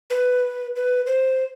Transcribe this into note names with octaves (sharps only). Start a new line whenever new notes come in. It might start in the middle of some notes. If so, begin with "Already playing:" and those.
B4
B4
C5